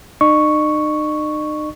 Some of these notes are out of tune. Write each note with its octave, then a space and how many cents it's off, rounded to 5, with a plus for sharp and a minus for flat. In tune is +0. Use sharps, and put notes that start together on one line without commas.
D#4 -35 D#5 -45 C#6 +0